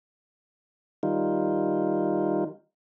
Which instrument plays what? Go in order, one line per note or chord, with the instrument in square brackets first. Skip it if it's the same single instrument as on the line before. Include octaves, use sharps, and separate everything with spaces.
[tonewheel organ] D#3 G3 D#4 F4